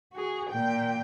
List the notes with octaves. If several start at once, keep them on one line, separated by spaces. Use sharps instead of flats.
F#4 G#4
A#2 G5